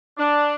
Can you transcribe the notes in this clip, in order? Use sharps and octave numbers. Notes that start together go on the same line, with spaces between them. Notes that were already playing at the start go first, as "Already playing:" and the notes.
D4